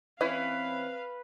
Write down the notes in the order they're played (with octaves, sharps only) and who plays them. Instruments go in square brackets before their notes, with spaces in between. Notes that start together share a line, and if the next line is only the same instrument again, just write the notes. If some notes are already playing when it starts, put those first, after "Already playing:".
[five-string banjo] E3 C#4 E4 [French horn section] C4 [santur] B4 [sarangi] F5